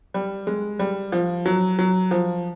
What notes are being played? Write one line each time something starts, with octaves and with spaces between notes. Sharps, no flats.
G3
G#3
G3
F3
F#3
F#3
F3